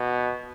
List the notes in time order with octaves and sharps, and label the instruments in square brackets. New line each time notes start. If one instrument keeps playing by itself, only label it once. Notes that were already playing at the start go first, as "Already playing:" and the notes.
Already playing: [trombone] B2